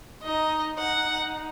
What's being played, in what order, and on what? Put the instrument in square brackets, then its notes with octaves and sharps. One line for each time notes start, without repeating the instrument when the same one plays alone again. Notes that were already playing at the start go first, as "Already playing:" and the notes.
[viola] D#4 [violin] D#5
[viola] D#4 [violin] F#5